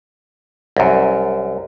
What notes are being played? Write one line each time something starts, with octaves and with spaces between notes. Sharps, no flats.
C2 F#2